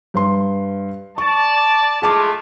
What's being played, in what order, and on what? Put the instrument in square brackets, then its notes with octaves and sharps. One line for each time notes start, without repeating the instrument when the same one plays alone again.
[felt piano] G2 B4 C6
[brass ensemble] D5 A5 [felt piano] C#6
[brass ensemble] G#3 A3 F4 [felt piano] G#4 A5 D6